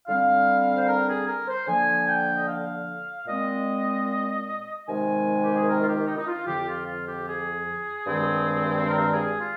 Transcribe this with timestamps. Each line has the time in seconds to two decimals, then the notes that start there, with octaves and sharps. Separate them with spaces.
0.08 D3 G3 C4 F5
0.77 C5
0.88 A#4
1.08 G#4
1.28 A#4
1.48 C5
1.67 D3 F3 A#3 G#5
2.08 G5
2.35 D#5
2.48 F5
3.27 A#2 G#3 C4 D#5
4.87 C3 D#3 G#3 G#5
5.43 G4
5.54 G#4
5.67 A#4
5.82 F4
5.87 G4
6.07 D#4
6.18 D#4
6.27 F4
6.46 F2 D3 F3 G4
6.67 F4
6.87 F4
7.07 G4
7.27 G#4
8.07 G2 D#3 G#3 C4
8.87 A#4
9.12 G#4
9.39 F4